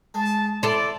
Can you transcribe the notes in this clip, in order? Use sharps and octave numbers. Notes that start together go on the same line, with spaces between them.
G#3 A5
E4 A4 C5 D5